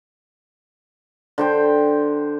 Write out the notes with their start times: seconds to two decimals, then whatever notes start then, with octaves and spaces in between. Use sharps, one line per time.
1.38 D3 C5 G5